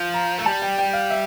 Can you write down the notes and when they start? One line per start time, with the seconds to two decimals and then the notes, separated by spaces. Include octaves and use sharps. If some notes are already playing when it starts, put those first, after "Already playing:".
Already playing: F3
0.14 A#5
0.38 A3
0.46 G3 A5
0.62 G5
0.78 G5
0.93 F5
1.10 E5